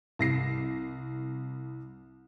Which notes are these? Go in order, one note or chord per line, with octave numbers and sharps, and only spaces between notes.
C2 A#6 C7